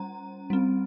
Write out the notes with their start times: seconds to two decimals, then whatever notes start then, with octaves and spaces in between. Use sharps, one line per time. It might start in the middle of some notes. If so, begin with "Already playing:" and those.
Already playing: G3 C#4 A#5
0.50 G3 C4